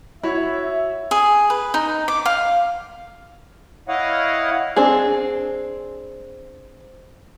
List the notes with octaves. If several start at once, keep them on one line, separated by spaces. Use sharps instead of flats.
E4 F#4 C#5 E5
G#4
B4
D#4
D6
F5
E4 C#5 D#5 F5 F#5
C4 D4 G#4